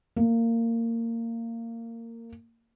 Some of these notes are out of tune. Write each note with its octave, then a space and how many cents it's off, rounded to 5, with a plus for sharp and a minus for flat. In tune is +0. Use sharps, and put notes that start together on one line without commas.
A#3 -20